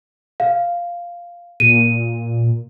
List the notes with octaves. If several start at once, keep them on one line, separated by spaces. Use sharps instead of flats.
F5
A#2 D#7